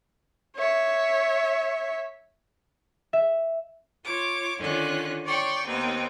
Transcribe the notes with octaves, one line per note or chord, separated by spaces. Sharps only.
C#5 E5
E5
F4 C#5 D6
D3 D#3 C#4 F4 F#6
C#5 D5 G5 C6 C#6
D#2 B3 C4 D#4 G5